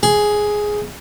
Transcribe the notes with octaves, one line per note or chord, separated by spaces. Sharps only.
G#4